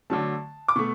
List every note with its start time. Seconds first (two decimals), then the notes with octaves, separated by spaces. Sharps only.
0.10 D3 F#3 A3 A5
0.68 D6
0.76 B2 A3 C#6